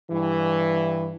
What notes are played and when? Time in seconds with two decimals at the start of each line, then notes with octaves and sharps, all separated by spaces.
0.11 G2 E3